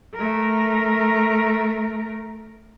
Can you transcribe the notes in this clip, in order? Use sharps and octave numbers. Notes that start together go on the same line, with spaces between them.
A3 A#4